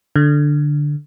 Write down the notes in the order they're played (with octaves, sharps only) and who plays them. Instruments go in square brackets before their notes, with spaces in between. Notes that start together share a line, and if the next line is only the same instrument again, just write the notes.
[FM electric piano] D3